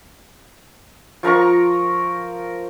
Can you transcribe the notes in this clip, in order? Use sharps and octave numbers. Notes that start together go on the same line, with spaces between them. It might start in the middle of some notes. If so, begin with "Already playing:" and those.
F3 A#4 A#5 C#6